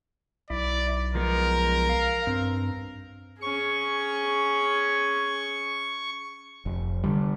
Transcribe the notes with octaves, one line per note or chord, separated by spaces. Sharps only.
B1 E4 D5
F3 G#3 B3 A#4
F5
G2 C4
C#4 G#4 C#6
F1
D3 G3